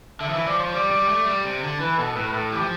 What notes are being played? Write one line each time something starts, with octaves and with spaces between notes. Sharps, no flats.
D3 E5
F3
E3
F3 D5
F3 C5
G3 D5
G3
A3
G3
C3
D3
E3 B4
B2 A4
A4
A2 B4
B4
A2 A4
E3 G4
F3